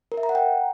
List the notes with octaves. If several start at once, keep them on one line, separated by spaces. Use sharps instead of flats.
A#4
E5
A#5
F#5
G5